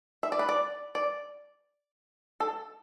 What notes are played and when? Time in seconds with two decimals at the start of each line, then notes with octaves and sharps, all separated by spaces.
0.23 E5
0.32 D5
0.39 B4
0.49 D5
0.95 D5
2.40 A4